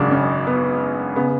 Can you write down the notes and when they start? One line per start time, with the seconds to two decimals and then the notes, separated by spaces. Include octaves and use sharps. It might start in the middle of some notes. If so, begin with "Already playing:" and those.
Already playing: G#1 F#2 C#3 D4
0.11 C#4
0.47 B3
1.16 C#3 B3